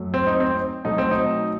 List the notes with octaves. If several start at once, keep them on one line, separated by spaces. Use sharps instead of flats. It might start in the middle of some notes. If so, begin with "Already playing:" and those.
Already playing: F#2 F#3 A3
C4
D#4
C4
B2 F#3 A3 D#4
C4
D#4